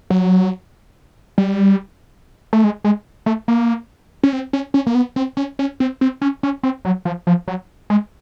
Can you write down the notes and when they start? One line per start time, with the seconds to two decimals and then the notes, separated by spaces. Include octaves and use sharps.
0.10 F#3
1.38 G3
2.53 A3
2.64 G#3
2.85 G#3
3.26 A3
3.48 A#3
4.23 C#4
4.33 C4
4.53 C#4
4.74 C#4
4.87 A#3
4.95 B3
5.16 C4
5.37 C#4
5.59 C#4
5.80 C4
6.01 C4
6.22 C#4
6.43 C#4
6.63 C4
6.85 F#3
7.05 F3
7.27 F3
7.48 F#3
7.90 G#3